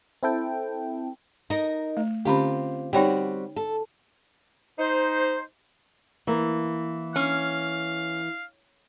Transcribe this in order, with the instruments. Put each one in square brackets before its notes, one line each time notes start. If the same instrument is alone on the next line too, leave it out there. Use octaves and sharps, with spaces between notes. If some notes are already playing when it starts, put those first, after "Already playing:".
[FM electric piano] C4 E4 A4 G5
[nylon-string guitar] D#4 A#4 D#5
[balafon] A3
[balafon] D3 C#4 B5 [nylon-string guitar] C4 F4 G4
[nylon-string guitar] G3 C4 F#4 [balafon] D#4 C#5 G5
[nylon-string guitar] A4
[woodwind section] D#4 C5
[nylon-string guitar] E3 A#3
[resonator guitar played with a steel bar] C#4 [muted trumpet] F5